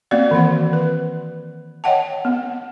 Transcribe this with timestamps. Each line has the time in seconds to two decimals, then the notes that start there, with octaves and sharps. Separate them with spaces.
0.11 A#3 C4 F#4 D5 F5
0.31 D#3 E3 F#5
0.73 B4
1.84 C#5 D#5 F#5 G5 A5
2.25 B3